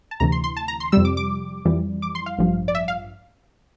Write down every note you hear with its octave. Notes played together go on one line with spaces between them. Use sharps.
A5
D2 C3 E3 A#5
C6
C6
A5
A#5
C6
F2 C3 G3 E6
D6
D6
F2 E3 G3
D6
C6
F5
A1 G2 F3
D5
E5
F5